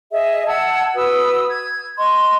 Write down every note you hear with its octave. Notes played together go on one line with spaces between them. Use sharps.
G#4 D#5 E5
F#5 A5 E6 G#6
F#4 B4 D#6 E6
G#6
D#5 C6 C#6